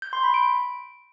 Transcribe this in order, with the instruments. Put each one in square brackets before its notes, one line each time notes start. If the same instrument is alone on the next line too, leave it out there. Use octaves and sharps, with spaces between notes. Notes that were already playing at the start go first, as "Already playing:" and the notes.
[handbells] G6
C6
B5
D7